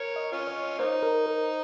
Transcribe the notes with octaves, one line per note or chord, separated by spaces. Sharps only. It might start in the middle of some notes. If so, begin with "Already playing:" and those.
Already playing: A#4 C#5
D#5
C#4 F4
C#5
A#3 D#4 C5
A#4
A#4